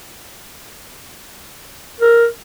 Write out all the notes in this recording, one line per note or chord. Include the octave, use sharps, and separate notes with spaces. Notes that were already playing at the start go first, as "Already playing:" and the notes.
A#4